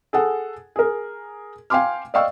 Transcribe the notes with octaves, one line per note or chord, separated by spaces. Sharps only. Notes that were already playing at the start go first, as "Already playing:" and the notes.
G#4 A4 F#5
G#4 A#4
F5 G5 G#5 C6 D6 F6
D5 D#5 F5 G5 C#6 E6